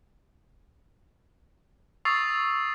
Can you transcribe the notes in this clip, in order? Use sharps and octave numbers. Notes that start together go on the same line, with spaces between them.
C#6 D#6 E6 A6 C7 F7